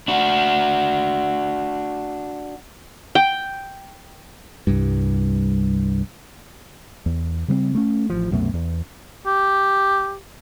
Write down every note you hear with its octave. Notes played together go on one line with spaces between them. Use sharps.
D4 F#4
G5
C2 G2
E2
C#3 G3 A3 C4
A3 C#4
A1 F3
C2 F#2 B2 A3
E2
G4